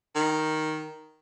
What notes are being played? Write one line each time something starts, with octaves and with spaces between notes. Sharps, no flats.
D#3